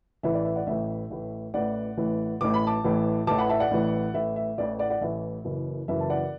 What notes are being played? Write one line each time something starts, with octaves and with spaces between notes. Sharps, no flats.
A1 A2 E3 E5
D5
E5
D5 F#5
A1 A2 E3 E5
A1 A2 E3
A1 A2 E3 D5 F#5
A1 A2 E3
A1 A2 E3 D6
B5
A5 D6
A1 A2 E3
A1 A2 E3 A5 D6
F#5 B5
E5 A5
D5 F#5
A1 A2 E3
A1 A2 E3 E5
E5
A1 A2 E3 D5
D5 F#5
D5 F#5
A1 A2 E3 E5
F#1 F#2 E3
F#1 F#2 E3 E5
A5
D5 F#5